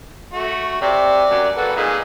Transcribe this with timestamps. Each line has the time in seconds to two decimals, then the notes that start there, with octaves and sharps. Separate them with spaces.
0.33 A3 F#4
0.82 C3 D5
1.30 F#2
1.57 A#3 F#4 A4 B4
1.76 A#2 D#4 G#4